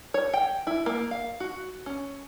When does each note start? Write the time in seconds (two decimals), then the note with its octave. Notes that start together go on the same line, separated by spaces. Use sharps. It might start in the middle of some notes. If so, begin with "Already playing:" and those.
0.14 C#5
0.33 G5
0.67 E4
0.86 A#3
1.11 F5
1.40 F#4
1.86 C#4